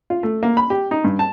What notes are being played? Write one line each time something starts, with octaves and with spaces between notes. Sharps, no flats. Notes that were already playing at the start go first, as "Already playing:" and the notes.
F4
A3
A#3
B5
G4
D#4
G2
A5